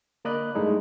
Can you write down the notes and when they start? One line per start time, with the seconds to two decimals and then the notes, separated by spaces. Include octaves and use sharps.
0.25 D3 A#3 D5 D#5 B5 F#6
0.55 G2 G#3 A3 D#4 E4